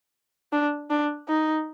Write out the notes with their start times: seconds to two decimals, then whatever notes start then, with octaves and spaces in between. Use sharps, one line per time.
0.53 D4
0.90 D4
1.29 D#4